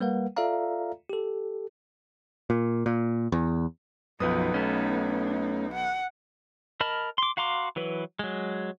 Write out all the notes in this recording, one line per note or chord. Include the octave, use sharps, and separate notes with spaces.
G3 A#3 A#4 B4 F5 F#5
F4 A4 D5 E5 F5 A#5
G4 A4
A#2
A#2
E2
B1 F#2 F3 B3 D#4 B4 D#6
A3 C#4
F#5
A#4 D#5 A5 B5 F6
C6 D6
F#4 F5 A#5 C6 D6
E3 F#3 B4
F#3 G#3